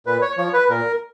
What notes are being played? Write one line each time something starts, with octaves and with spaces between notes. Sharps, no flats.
A#2 B4
C#5
F3 C#5
B4
A#2 A#4